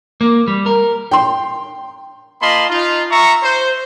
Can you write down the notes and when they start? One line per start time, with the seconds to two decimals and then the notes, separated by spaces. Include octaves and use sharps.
0.21 A#3
0.48 G3
0.66 A#4
1.11 G5 C6
2.41 A#3 F4 D#5 A5 B5 C6
2.70 D#4 F4
3.10 E5 A#5 C#6
3.43 C5